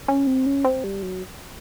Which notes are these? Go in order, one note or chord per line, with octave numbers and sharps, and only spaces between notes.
C#4
C4
C#4
C4
G3
F#3